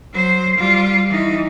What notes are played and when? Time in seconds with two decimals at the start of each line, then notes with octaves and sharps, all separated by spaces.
0.13 F#3 C5
0.57 G3 F4
1.10 E3 D#4